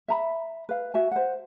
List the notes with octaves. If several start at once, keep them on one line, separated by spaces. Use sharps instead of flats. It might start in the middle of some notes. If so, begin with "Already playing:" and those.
E5 A#5 B5
B4 F5
F#4 E5 G#5
C5 F#5